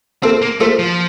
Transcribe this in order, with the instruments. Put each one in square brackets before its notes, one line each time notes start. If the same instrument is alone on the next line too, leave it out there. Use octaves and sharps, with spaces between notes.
[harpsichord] F3 A#3 F4 A4 [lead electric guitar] C4
[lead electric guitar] A#3
[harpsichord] F3 A#3 F4 A4 [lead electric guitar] A3
[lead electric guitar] F3